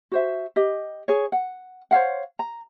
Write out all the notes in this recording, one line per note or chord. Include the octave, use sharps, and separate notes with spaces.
F#4 C5 E5
G4 D#5
G#4 C#5
F#5
C5 C#5 F5 F#5
A#5